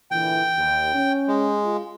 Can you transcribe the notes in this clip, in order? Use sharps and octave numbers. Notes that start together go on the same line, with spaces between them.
A#2 D3 E3 G5
D#2
C#4
G#3
F4